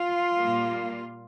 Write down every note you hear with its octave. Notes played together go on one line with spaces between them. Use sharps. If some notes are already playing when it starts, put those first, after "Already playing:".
Already playing: F4
A#2 G3 A#3